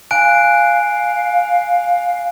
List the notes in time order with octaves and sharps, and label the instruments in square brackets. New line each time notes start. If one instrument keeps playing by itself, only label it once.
[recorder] F5 [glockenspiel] G#5 F#6 D7